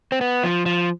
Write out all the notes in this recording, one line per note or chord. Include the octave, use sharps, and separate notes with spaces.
C4
B3
F3
F3